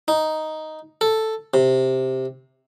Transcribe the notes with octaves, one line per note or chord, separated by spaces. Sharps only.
D#4
A4
C3